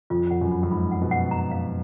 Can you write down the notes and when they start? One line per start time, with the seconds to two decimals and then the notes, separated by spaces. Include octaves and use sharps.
0.10 F2 F4
0.31 F2 F#5
0.41 F#2
0.51 B5
0.63 F#2
0.71 G#2 B5
0.92 F#5
1.02 B2
1.11 F#5
1.31 A#5
1.51 F5